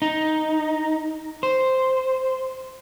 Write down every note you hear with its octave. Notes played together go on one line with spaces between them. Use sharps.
D#4
C5